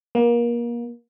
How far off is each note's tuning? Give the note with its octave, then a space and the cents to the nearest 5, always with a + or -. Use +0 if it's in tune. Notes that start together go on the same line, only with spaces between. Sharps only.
A#3 +30